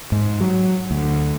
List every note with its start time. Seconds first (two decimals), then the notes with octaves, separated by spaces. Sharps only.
0.12 G#2
0.41 F#3
0.91 D2